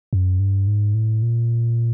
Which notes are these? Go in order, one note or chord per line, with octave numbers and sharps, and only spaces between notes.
F#2
G2
G#2
A2
A#2